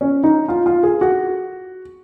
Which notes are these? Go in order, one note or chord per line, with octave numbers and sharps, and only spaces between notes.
C#4
D#4
F4
F4
G#4
F#4